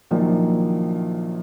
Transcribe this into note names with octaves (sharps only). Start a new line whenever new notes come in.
A#1 A#2 D#3 F3 F#3